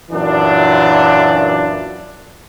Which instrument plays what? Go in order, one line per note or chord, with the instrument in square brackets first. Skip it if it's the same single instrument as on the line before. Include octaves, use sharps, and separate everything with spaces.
[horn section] F#2 A#2 E3 D4